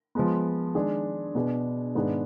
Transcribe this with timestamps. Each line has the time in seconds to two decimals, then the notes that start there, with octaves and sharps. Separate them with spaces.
0.15 F3 G#3 B3
0.75 D#3 G#3 D4 G#4
1.35 B2 B3 D4 G#4
1.95 G#2 D#3 B3 D4 G#4